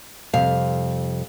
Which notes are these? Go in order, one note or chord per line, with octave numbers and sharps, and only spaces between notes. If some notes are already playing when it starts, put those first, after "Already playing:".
F2 C3 G3 F5